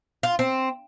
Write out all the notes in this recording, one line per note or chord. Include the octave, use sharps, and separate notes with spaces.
F4
C4